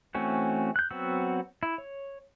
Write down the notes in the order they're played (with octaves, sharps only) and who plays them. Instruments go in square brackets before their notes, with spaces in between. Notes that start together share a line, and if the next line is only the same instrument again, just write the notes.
[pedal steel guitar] E3 A3 C4 C#4 F#4
F#6 G6
F#3 B3 C4 F#4 E6
E4
C#5